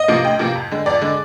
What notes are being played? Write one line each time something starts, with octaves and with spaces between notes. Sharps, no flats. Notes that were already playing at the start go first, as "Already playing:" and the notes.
Already playing: D#5
C3 F3 A#3
D2 G5
C3 F3 A#3
F2
D3 G#3
F2 D5
D3 G#3